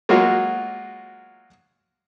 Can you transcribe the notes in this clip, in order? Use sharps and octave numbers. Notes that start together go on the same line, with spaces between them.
F#3 G#3 A#3 F4 F#4